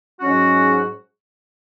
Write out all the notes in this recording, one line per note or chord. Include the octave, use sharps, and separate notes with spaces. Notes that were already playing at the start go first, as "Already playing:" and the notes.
G#2 F#3 C#4 F#4